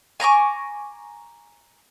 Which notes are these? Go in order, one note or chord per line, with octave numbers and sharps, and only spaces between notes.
G#5 A#5 C#6 D6